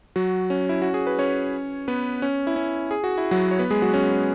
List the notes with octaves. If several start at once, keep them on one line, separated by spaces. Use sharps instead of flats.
F#3 F#4
C#4
E4
F#4
G#4
B4
C#4 C#5
B3 B4
C#4
E4
C#4
G#4
F#4
E4
F#3 F#4
C#5
B3 B4
G#3 G#4
F#3 F#4
C#4